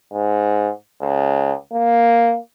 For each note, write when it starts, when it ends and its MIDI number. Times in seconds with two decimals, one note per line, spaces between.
0.13 0.71 44
1.01 1.54 37
1.73 2.37 58